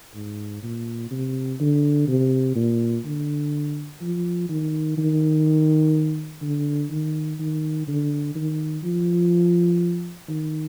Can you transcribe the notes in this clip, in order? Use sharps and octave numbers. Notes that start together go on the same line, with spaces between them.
G#2
A#2
C3
D3
C3
A#2
D3
F3
D#3
D#3
D3
D#3
D#3
D3
D#3
F3
D#3